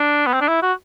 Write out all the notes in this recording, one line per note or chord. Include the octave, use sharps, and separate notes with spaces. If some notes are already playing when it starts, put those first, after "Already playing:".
Already playing: D4
B3
C4
D4
E4
F#4